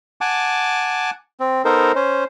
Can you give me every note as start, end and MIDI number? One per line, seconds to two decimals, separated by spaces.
0.21 1.10 78
0.21 1.10 80
0.21 1.10 81
0.21 1.10 86
1.40 1.62 60
1.65 1.92 59
1.65 1.92 63
1.65 1.92 69
1.65 1.92 70
1.65 1.92 72
1.96 2.24 61
1.96 2.24 72